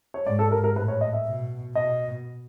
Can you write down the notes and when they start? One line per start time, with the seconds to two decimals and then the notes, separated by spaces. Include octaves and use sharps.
0.14 C#5
0.26 G#2 D5
0.39 A4
0.51 A#4
0.64 A#4
0.76 A2 B4
0.88 C#5
1.01 D#5
1.13 E5
1.26 B2
1.75 B2 D#5